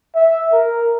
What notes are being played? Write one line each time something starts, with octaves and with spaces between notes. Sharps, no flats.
E5
A#4